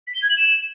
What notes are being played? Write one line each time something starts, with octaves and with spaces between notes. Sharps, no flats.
B6
G7
G#6
F#7
E7